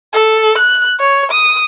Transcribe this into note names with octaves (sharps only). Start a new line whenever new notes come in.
A4
F#6
C#5
D#6